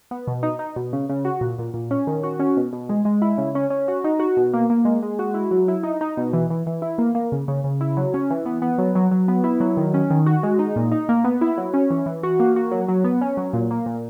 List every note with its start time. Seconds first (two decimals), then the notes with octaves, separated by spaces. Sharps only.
0.11 B3
0.27 B2
0.43 D#4
0.59 D#4
0.76 B2
0.93 C#3
1.09 C#3
1.25 F#4
1.41 A#2
1.59 A#2
1.74 A#2
1.91 C#4
2.07 D#3
2.23 F#4
2.39 C#4
2.57 B2
2.73 B2
2.89 G#3
3.05 G#3
3.22 E4
3.38 C#3
3.55 C#4
3.70 C#4
3.88 F#4
4.04 D#4
4.20 F#4
4.37 B2
4.53 A#3
4.70 A#3
4.85 G#3
5.02 G#3
5.19 F#4
5.34 E4
5.51 F#3
5.68 E4
5.83 D#4
6.01 D#4
6.17 B2
6.33 E3
6.50 E3
6.66 E3
6.82 E4
6.98 A#3
7.15 A#3
7.32 C#3
7.48 C#3
7.64 C#3
7.81 E4
7.97 F#3
8.14 C#4
8.30 E3
8.45 B3
8.62 B3
8.78 F#3
8.95 F#3
9.11 F#3
9.28 B3
9.44 E4
9.60 F#3
9.77 D#3
9.94 C#4
10.10 D#3
10.26 F#4
10.43 G#3
10.59 D#4
10.76 A#2
10.91 D#4
11.09 A#3
11.24 B3
11.41 E4
11.57 F#3
11.74 C#4
11.90 E3
12.06 E3
12.23 F#4
12.40 A#3
12.56 F#4
12.71 F#3
12.88 F#3
13.04 B3
13.21 C#4
13.37 F#3
13.53 A#2
13.71 A#3
13.86 A#2